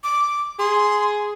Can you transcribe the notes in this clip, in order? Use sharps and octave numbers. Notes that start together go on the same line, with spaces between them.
D6
G#4 C6